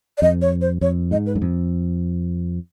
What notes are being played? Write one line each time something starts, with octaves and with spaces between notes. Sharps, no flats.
D5
F2 D#5
C#5
C5
F2 C#5
G#2 D#5
B4
F#2
F2